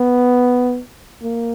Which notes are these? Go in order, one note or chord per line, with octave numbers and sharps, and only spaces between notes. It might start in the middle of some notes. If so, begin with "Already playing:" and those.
Already playing: B3
A#3